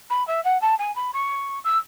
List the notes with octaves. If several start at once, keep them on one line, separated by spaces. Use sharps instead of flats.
B5
E5
F#5
A5
G#5
B5
C#6
E6